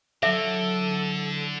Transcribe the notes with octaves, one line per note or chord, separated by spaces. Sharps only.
D3 F#3 E4 A4 E5